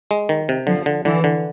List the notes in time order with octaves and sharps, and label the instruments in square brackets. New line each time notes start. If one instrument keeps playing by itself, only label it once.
[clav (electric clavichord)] G#3
D#3
C3
[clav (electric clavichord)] D3 [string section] F3
[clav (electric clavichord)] D3
[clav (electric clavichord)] D3 [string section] E3
[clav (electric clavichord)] D3